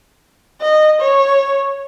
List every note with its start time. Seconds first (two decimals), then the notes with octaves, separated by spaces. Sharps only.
0.62 D#5
1.01 C#5